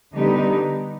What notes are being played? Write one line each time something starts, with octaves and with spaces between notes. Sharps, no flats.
D3 G3 B3 D#4 G4